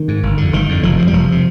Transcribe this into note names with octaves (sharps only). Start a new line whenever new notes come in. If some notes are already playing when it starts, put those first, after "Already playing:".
Already playing: D#3
G#2
G1
F2 D3
G1 D#3
F2 D3
F1 F3
F2 C3
G3
F1 F3
C3